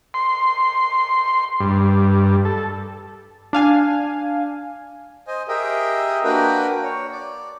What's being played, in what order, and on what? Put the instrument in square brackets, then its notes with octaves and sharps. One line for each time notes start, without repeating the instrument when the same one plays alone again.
[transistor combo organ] C6
G2
A4
[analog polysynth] D4 F5 G#5
[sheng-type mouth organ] C5 D#5 G#5
G4 G#4 A#4 D#5 E5 G5
A#3 D4 F#4 A#4 B4 G5
C#5
D5